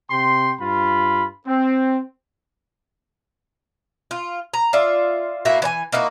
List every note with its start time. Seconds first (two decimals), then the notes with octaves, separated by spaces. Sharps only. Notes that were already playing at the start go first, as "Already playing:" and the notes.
0.11 C3 G5 C6
0.60 G2 F4 B5
1.47 C4
4.11 F4
4.54 A#5
4.73 F4 D5 E5
5.45 A2 A#3 E4 F#4
5.62 E3 C#5 G#5
5.92 A#3 D#4 E4 F#4